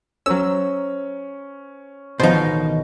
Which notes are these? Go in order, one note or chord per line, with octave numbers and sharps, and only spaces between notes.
F#3 C#4 C5 A#5 E6
A1 B2 D#3 F3 D#4 F#4 C5